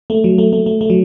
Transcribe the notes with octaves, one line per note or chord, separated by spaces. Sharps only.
A3
F#3
A3
A3
A3
A3
F#3